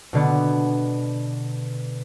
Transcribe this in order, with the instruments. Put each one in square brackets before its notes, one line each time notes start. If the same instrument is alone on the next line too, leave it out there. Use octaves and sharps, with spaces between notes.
[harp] B2 D3 B3